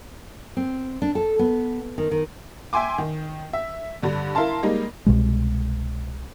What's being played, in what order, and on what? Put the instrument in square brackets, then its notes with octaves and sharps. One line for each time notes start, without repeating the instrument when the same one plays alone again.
[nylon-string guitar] C4
D4
A4
B3
D#3
D#3
[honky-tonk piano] E5 G5 G#5 C6 D6
D#3
E5
G2 D3 D4
E4 A#4 F5 A5 C6
G3 G#3 A#3 D#4
[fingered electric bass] C2 B2 G#3